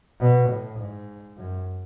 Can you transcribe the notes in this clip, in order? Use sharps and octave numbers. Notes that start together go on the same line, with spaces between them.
B2
A2
G#2
F#2